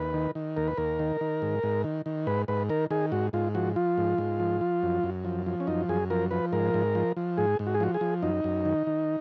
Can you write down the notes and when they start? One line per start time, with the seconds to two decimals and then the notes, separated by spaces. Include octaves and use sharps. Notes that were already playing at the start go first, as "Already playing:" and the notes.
Already playing: D#2 B4
0.14 D#3
0.35 D#3
0.57 D#2 A#4
0.68 B4
0.77 D#2 A#4
0.99 D#3
1.21 D#3
1.42 G#2
1.63 G#2
1.84 D#3
2.06 D#3
2.27 G#2 B4
2.48 G#2 B4
2.69 D#3 A#4
2.90 D#3 G#4
3.12 G#2 F#4
3.33 G#2 F4
3.55 F3 F#4
3.76 F3 F4
3.98 G#2
4.18 G#2
4.40 F3
4.61 F3
4.83 F#2
5.03 F#2
5.25 F3
5.46 F3
5.60 C#4
5.67 F#2 D#4
5.89 F#2 G#4
6.10 F3 A#4
6.31 F3 B4
6.52 G#2 A#4
6.74 G#2
6.95 F3
7.17 F3
7.37 G#2 G#4
7.59 G#2
7.67 F#4
7.74 G#4
7.80 F3 F#4
7.94 G#4
8.01 F3
8.23 F#2 D#4
8.44 F#2
8.65 D#3
8.87 D#3